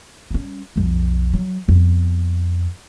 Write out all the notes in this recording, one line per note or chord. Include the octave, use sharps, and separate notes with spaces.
G3 C#4
B1 F2
F#3
F2 B3